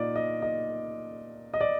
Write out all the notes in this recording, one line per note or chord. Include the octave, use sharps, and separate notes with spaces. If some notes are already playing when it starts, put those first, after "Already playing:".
Already playing: A#2 D#4 D5 D#5
D#5
D#5
D#5
D5